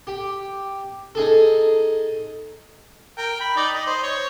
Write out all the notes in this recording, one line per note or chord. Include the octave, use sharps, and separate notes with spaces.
G4
D#4 G#4 A4
A#4 G5
B5
D#4 D5
D#5
C5
C#5